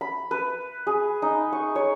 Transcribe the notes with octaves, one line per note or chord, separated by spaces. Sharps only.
B5
B4
G#4
D#4
C#6
C#5